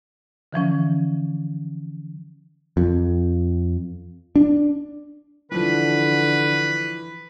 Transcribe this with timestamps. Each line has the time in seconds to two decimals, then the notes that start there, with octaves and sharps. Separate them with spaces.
0.53 D3 E3 F3 C#4
2.77 F2
4.36 D4
5.52 D3 E3 F3 B4